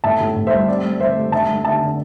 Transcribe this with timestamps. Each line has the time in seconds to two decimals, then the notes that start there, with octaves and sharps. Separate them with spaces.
0.04 A2 E5 A5
0.20 A2
0.36 A2
0.47 C5 E5
0.52 G3
0.68 C4 D5
0.84 A3
1.00 C4 C5 E5
1.16 A3
1.32 D3 E5 A5
1.49 A3
1.65 D3 E5 A5
1.81 D3